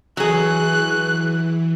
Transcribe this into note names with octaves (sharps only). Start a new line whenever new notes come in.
E3 F#3 G#4 F#6